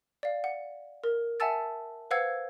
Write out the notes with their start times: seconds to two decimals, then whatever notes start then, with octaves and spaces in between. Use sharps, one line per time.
0.23 D5 F5
0.44 F#5
1.04 A#4
1.40 E5 F#5 G#5 A5 E6 A6
2.11 B4 C5 F5 F#5 E6 G#6